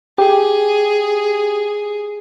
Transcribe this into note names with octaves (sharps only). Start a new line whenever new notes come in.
G4 G#4